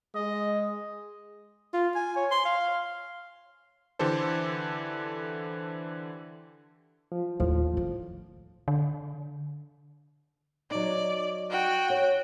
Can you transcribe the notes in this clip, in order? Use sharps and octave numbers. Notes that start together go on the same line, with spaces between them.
G#3 D#5
F4
G#5
C#5
C6
F5
D3 E3 G4 A4 C5
F3
D#2 A2 F3
D#3
D3
F#3 D#4 D5
F#4 G5
C#5